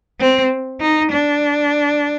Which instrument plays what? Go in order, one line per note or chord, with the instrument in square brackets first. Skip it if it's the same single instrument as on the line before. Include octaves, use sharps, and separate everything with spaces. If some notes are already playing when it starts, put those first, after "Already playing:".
[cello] C4
D#4
D4